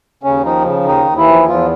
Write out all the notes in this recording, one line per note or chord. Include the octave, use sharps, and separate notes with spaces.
D#2 C#3 C#4
D#3 F3 D#4
C#3
D#2 D#3 D#4
D#2
E3 E4
F3
E2 F3 F4